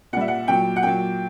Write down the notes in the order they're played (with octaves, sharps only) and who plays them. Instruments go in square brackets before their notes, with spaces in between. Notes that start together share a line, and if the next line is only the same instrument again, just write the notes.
[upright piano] A#2 F#5
G3 E5
F#5
A#2 F#3 G5
F#5
A#2 F#3 G5